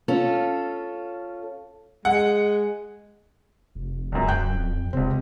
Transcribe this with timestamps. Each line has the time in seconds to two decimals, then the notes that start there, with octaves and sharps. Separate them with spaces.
0.08 C#4 F4 A4
2.05 G#3 F#5
3.75 F1
4.12 D1 C#2 F#2
4.28 F#2 G5 F#6 G6
4.55 F2
4.93 D#1 C#2 C3 C4